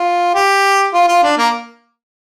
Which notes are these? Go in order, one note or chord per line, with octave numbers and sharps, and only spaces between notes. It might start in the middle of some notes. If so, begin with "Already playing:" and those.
Already playing: F4
G4
F4
F4
D4
A#3